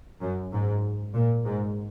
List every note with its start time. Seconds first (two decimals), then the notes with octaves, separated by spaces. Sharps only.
0.21 F#2
0.52 G#2
1.14 A#2
1.45 G#2